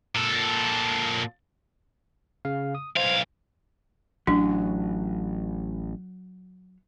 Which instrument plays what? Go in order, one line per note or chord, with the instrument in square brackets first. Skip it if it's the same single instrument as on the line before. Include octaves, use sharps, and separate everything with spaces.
[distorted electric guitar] A#2 A4
[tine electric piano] C#3 F5
D#6
[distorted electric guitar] B1 F5 [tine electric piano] C5 G#6
[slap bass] A1 [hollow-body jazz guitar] F#3 [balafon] D4